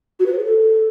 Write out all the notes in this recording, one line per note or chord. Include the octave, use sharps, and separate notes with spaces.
F#4
B4
C5
G#4
A4